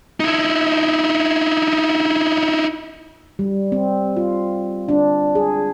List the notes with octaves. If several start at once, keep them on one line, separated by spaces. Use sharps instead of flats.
D#4 E4
G3
C4
F4
D4
G#4